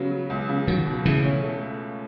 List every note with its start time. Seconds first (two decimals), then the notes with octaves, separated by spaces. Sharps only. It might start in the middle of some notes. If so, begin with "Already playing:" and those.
Already playing: C#3 F#3 B3
0.10 F#3
0.30 C#2
0.49 C#3
0.67 D#3 F#3 F#4
0.86 B2
1.05 C#3 E3 A3
1.24 C#4
1.43 A3